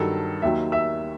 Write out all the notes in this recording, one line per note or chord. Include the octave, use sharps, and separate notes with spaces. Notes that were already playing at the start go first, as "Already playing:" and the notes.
Already playing: G2 D#3 F#3 A4 A5
D#2 D#3 F#3 E5
E5 E6